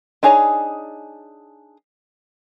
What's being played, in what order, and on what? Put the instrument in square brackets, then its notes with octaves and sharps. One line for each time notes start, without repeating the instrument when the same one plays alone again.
[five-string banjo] D4 D#4 G#4 C#5 A#5